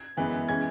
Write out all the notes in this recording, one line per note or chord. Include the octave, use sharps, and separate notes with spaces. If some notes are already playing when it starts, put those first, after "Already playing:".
Already playing: G#6
F#2 E3 G#3 B3
E3 G#3 C#4 G#6